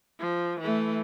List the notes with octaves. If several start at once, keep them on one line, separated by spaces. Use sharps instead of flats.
F3
E3 A3